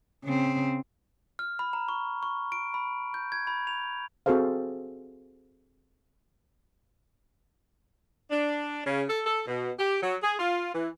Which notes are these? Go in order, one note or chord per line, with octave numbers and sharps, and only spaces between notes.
C#3 C4
F6
B5
A#5
C#6
C#6
D7
B5
G6
G#6
B5
F7
C4 F#4 G#4 A4 C5 F5
D4
C#3
A4
A4
B2
G4
F#3
G#4
F4
E3